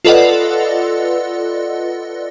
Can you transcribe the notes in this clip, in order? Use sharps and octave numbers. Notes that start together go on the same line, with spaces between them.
F4 A4 B4 D5 D#5 F#5